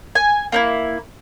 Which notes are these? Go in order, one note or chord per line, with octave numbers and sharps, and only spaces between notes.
G#5
A#3 D#4 E4